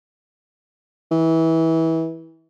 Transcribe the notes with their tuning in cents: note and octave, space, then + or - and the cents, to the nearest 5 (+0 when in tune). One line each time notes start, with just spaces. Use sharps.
E3 -25